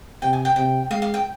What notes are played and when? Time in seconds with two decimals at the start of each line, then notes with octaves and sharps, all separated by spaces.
0.22 C3 G5
0.33 G#5
0.45 G5
0.56 C3 G5
0.90 G#3 F5
1.02 F5
1.14 G5